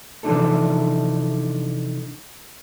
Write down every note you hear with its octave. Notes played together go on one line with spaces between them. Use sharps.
C3 E3 F3 D4 D#4 A4